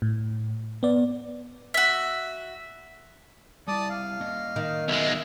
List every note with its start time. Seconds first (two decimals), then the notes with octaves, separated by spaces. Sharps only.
0.02 A2
0.83 B3 D5
1.74 F#4 E5
3.68 G3 E4 D5 A5 D#6
3.90 F5
4.21 A#3 C#4 D#5
4.56 D#3
4.88 B1 G#3 E5 F5